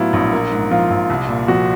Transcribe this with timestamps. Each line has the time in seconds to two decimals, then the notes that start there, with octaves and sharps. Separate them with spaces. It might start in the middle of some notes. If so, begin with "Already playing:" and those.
Already playing: A2 F#3 B3 E4 F4
0.13 A#1
0.32 A#3
0.52 G#2
0.71 F3 F4
0.90 A#1
1.10 C2
1.29 A#2
1.48 F3 F#4